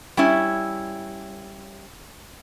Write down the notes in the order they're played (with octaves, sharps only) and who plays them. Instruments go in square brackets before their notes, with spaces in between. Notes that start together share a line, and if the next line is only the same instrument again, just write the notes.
[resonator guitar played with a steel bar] G3 C#4 E4